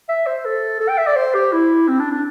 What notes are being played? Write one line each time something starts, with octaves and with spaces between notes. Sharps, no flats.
E5
C5
A4
A4
G5
E5
D5
C5
G4
E4
C4
D4
D4